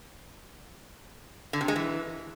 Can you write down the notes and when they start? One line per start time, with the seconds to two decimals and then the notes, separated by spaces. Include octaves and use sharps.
1.53 D3
1.61 C3
1.68 G#3
1.76 E3